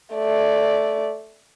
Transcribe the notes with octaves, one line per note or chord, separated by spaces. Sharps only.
A3 D5